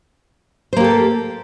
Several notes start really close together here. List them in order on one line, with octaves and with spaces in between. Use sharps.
C5 A#3 G4 A4